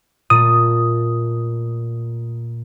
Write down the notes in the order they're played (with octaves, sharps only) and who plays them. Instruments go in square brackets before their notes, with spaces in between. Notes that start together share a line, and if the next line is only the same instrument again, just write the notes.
[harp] A#2 A3 [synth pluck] D#6